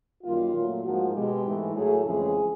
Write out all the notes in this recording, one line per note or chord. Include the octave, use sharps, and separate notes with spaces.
F#2 D#3 G3 A#3 F4
A#2 F#3 A3
G#2 F3 A#3 F#4
B2 G#3 G4
G#2 E3 A3
A2 F#3 A3 G#4
F2 C#3 E3 G#3 G#4